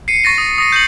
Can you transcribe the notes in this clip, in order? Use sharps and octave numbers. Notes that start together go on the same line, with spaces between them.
C7 C#7 D#7
C#6 A6 A#6 D#7
D#6
D#6 A#6 D#7
G6 C#7 D#7 F#7